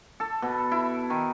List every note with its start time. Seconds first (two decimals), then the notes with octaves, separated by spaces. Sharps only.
0.20 A4
0.42 B2
0.72 E4
1.10 D#3